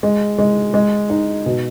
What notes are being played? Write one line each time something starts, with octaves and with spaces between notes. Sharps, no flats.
G#3
G#3
G#3
D#4
B2